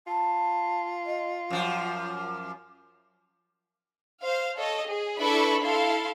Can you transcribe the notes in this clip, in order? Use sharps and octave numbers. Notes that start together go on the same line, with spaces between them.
F4 A5
D#5
F#2 F3 D6
C5 F5
A4 C#5 D#5
G#4
D4 E4 A4 B4 B5 C#6
E4 A4 F5 C6